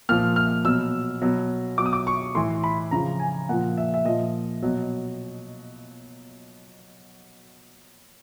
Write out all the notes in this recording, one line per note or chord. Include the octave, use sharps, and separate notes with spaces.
A#2 F3 F6
F6
B2 F#3 E6
B2 F#3
B2 F#3 D6
D#6
D6
C#6
A2 E3 C6
B5
C#3 F3 A#5
G#5
A#2 F3 F#5
E5
E5
A#2 F3 D#5
B2 F#3